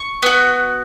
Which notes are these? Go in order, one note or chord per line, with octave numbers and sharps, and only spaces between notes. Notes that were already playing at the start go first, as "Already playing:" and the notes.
Already playing: C#6
B3 F#4